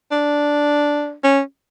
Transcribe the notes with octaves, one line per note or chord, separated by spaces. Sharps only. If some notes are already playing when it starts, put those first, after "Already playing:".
D4
C#4